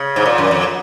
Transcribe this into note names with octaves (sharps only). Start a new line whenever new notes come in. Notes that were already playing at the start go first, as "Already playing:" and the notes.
Already playing: C#3
G#2
A#2
F#2
F2